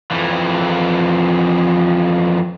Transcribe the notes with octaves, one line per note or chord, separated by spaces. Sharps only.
F2 E3